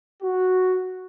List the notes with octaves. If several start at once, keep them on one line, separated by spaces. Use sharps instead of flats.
F#4